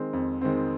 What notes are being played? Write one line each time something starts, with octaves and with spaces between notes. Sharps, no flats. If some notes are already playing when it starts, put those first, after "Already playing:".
Already playing: D#3 G#3 C4
F2
D#3 G#3 C4